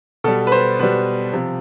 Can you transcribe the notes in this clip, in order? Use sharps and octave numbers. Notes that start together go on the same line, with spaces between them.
B2 G3 A4
B4
C5
B2 G3 B4
C3 F3